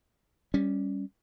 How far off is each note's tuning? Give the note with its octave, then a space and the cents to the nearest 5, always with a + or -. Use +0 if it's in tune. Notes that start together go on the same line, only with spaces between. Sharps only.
G3 +10 C#4 +0